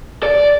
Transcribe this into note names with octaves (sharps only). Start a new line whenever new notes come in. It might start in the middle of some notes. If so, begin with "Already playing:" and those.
D5